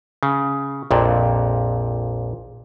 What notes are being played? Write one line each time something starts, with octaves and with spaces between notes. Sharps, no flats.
C#3
A#1 F2 A#2